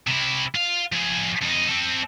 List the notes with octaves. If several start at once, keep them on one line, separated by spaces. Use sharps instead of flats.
C3 E4
F4 F5
F3 G#4
F2 D#4
C4 A4